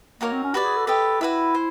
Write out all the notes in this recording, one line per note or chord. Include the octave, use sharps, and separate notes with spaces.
A#3 D#4 F#4 A#4 C#5
C4
C#4
F#4 G4 B4 D5
G#4
A4
G4 A4 B4 D#5
E4 F#4 B4 E5
C5